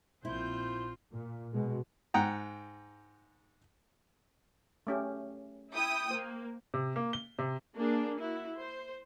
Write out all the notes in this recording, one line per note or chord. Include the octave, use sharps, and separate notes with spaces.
A#1 C4 E4 F4 C5 G6
A#2
B2 G#3
G#2 F#5 G5 A#5
A3 C#4 G4
E4 G5 D#6
A#3 C5
C3
A#3
G7
C3
A#3 D4 G#4
E4 F#4
C5